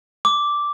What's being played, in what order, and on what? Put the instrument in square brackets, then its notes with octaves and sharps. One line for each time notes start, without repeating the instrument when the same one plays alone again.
[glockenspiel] D6